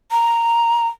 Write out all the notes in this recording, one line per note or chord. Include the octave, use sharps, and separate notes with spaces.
A#5